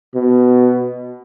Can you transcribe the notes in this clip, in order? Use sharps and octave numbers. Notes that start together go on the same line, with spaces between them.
B2